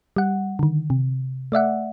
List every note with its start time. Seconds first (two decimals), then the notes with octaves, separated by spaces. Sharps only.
0.16 G3 F#5
0.59 D3 D#3
0.90 C3
1.52 A3 D5 E5 F#5